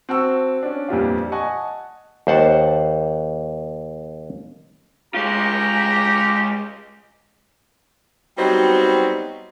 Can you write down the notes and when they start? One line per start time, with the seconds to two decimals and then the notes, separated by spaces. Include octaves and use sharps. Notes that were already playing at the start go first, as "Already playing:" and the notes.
0.09 C4 F#4 A5 C#6 E6
0.63 C#4 D4
0.89 F2 A#2 E3 G3 D4 F4
1.32 D#5 F#5 G#5 A5 C#6
2.27 D#2 C5 F#5 A5
5.14 G#3 F4 G4 A#5
8.38 F#3 G3 B3 C4 D#4 F#4